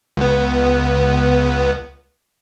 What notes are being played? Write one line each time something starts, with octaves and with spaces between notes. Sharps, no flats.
C#2 B3